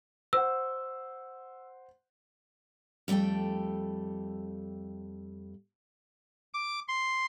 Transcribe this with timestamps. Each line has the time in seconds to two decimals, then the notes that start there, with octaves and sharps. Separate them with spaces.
0.33 C5 F#5 E6
3.08 F2 G3 A3 A4 G5
6.54 D6
6.88 C6